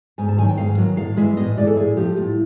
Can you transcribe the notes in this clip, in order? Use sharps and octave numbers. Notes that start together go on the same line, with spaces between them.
G#2 G#5
A5
D#3 F#3 G#5
G5
G#2 F5
D#3 F#3
A2 F5
E3 G#3 E5
A2 D#5
E3 G#3 D5
A4
A2 G#4
F3 A3 G4
A2 F4